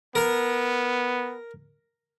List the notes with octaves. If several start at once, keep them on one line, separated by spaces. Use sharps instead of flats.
B3 A#4 A#5